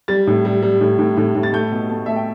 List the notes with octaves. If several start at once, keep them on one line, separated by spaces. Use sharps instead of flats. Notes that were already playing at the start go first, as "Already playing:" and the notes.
G3 A6
A2
G3
G3
A2
A2
A2
A2
A6
A3 G6
B2
A3
A3 E5
G5